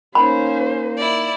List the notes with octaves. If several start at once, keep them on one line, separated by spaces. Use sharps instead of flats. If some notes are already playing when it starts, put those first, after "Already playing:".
A#3 C#4 D#4 C5 B5
E4 D5